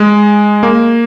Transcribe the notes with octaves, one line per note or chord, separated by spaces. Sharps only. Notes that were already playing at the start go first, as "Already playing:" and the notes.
Already playing: G#3
A#3